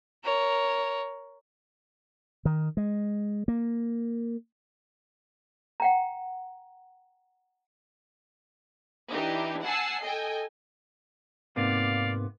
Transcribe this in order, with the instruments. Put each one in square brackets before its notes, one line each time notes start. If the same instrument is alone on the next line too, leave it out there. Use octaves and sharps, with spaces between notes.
[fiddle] A#4 C#5
[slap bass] D#3
G#3
A#3
[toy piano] F#5 G5 A#5
[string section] E3 D4 D#4 G4
F#5 G#5 A5 E6 C7
A4 D#5 G5 G#5
[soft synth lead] G#2 [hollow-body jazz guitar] C3 A#3 B3 [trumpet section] D5 F5